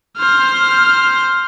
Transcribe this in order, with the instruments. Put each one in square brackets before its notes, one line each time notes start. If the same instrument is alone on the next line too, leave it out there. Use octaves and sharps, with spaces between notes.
[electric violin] C5 F6